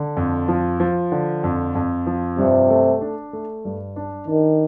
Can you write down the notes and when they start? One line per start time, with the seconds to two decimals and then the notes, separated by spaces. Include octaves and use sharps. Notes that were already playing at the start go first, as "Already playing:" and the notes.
Already playing: D3
0.17 F2
0.48 F3
0.80 F3
1.12 D3
1.44 F2
1.75 F2
2.07 F3
2.38 G2 C3
2.70 A3
3.01 D4
3.33 A3
3.65 G2
3.96 D4
4.28 D#3 D4